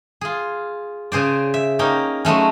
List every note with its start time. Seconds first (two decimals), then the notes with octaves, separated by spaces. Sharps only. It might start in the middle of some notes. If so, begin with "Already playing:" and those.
0.21 F4 G#4
1.12 C#3 G#4 C5 D5
1.54 E5
1.79 A#3 C#4 D#4 G5
2.25 F#3 G#3 A3 C#4